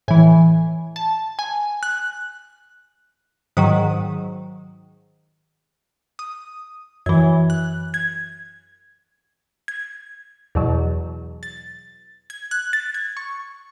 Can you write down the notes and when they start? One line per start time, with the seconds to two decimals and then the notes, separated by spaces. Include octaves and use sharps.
0.08 A2 E3 G#5
0.96 A5
1.39 G#5
1.83 F#6
3.57 G#2 D#3 F#3 D#6
6.19 D#6
7.06 F#2 E3 G#6
7.50 F#6
7.94 G#6
9.68 G#6
10.55 E2 B2 F#3
11.43 A6
12.30 G#6
12.51 F#6
12.73 A6
12.94 G#6
13.17 C#6